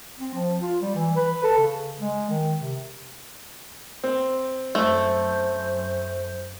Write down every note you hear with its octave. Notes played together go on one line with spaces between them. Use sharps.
C4
F3
F4
G3
E3
B4
A4
C#3
G#3
D#3
C3
C4
F#2 A3 C5